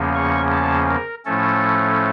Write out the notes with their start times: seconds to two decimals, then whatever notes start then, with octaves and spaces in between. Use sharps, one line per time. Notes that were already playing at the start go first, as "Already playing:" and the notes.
Already playing: E2 C#3 F3 A#3 C#4
0.15 C#6
0.52 A5
0.89 A#4
1.25 A2 F3 A3 C#4 A4